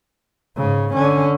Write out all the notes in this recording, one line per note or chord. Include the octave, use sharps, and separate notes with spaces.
G#2 C#3
D3 C#4